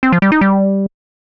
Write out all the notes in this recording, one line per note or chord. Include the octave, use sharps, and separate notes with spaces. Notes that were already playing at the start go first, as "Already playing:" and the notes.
C4
F3
G3
D#4
G3